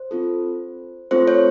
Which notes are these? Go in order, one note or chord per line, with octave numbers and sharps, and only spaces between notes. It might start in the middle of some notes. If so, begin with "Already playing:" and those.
Already playing: C5
C4 F4 A4
A3 C4 F4 A4 C5
C#5